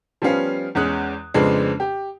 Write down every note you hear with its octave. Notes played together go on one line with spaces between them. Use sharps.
F3 G3 B3 C#4 F5
E2 G#3 C#4 D#6 F#6
F2 C#3 G#3 B3 C4 D4
G4